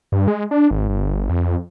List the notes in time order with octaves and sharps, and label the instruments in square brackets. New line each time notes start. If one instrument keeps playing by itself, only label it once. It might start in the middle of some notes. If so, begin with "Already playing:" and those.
[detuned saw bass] G2
G#3
D4
G#1
G1
F2